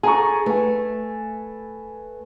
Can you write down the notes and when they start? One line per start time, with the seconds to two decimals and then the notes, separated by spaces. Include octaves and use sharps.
0.03 G#4 A4 G#5 A#5 C#6
0.46 A3 B4 G#5